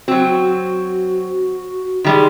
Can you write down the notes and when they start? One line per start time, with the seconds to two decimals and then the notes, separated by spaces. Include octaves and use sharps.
0.08 F#3 C4 F#4
2.04 D#3 G3 G#3